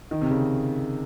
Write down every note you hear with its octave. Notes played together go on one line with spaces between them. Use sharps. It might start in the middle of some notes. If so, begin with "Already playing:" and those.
D#3
C3
C#3